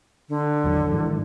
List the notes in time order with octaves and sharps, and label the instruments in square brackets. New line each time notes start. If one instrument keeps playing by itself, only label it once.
[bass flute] D3
[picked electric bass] G#1 E2 F#3
G#2 D#3 E3